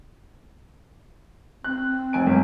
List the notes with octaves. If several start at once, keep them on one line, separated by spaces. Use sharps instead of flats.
C4 F#6
F1 G#5 D7
G1